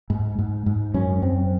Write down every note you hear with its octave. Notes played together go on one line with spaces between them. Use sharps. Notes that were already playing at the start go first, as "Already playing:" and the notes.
G#2
G#2
G#2
F#2 C#4
F#2 C4